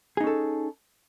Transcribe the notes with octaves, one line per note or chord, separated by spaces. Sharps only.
C#4 D#4 G#4 A4